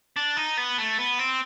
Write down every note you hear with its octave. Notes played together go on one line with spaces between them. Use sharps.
D4
D#4
B3
A3
B3
C4